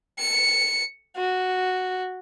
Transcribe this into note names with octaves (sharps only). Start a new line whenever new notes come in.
C#7
F#4